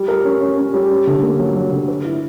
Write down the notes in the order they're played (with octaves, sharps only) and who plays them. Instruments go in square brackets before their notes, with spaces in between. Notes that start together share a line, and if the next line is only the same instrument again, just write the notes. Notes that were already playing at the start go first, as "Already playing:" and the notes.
Already playing: [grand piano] G3
A#4
C#4
C#4
C#4
G3
C#4
D3
A#3
F#3
F#3
D3
B4
E4